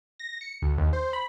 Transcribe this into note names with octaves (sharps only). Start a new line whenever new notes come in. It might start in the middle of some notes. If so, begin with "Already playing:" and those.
A#6
C#7
D2
D#2
C5
B5